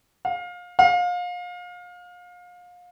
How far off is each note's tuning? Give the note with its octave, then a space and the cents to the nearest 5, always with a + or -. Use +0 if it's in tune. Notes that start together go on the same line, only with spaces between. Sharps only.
F5 +25
F5 +30